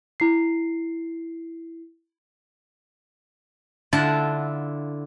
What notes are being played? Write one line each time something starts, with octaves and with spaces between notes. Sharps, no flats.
E4 C7
D3 E4 F4 F#5 A5